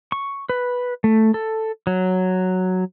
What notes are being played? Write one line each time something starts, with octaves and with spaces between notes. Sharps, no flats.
C#6
B4
A3
A4
F#3